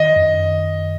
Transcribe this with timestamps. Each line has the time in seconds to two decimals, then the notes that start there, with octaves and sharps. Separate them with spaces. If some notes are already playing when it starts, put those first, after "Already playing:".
Already playing: D#3 D#5
0.16 F#2